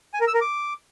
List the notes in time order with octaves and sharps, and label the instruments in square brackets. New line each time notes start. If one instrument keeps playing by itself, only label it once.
[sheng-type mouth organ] G#5
A#4
E6
A#4
D6